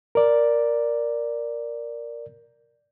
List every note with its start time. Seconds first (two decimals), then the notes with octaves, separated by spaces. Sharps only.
0.15 A#4 D5